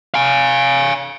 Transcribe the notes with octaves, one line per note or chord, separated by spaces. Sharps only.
F5 G#5